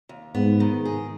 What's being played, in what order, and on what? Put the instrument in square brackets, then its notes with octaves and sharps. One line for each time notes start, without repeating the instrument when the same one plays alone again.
[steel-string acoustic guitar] D#2
[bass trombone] G#2 [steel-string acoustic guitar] B3
[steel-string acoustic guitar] D#3
G#4